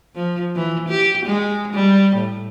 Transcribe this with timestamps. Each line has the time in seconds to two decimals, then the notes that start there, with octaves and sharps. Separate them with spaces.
0.15 F3
0.55 E3
0.89 G4
1.26 G#3
1.73 G3
2.16 A2